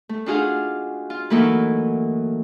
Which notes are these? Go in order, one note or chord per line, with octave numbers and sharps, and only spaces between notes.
A3
D4 D#4 F4 F#4 G#4 F5
F4
E3 F#3 A3 A#3 D#4 E4